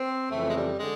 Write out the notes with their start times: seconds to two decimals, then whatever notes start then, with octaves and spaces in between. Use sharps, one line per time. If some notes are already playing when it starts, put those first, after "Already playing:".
Already playing: C4
0.32 F2 C#3 E3 A3
0.48 G#3
0.55 G3
0.79 D3 G#3